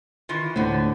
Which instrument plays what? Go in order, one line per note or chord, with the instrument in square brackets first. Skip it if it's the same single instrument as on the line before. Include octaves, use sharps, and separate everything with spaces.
[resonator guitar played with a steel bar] D#3 E3 F4
[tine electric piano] D2 A2 C5 [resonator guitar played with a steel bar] D3 B3 [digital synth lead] A3